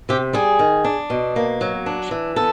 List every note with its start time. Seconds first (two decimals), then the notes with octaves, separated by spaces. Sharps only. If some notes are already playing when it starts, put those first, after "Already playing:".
0.09 C3 G4
0.33 G3 G#4
0.59 D#3
0.85 D4
1.10 B2
1.36 A#3
1.61 F#3
1.86 D4
2.11 E3
2.36 B3 A4